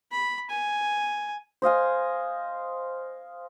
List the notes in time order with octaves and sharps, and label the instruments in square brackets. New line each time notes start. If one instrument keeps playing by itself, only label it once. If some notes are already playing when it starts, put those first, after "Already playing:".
[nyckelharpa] B5
G#5
[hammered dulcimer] C5 D#5 F5 G#5